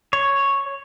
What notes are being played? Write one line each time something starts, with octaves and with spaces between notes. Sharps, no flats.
C#5